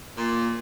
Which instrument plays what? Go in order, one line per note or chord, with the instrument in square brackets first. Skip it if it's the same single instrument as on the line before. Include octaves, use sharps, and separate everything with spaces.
[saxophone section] A#2